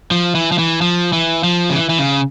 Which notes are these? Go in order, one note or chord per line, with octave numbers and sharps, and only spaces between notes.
F3
E3
F3
E3
F3
E3
F3
C#3
E3
E3
C#3